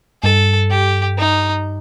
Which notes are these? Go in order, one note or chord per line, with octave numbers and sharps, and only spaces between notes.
G2 A4
G4
D#4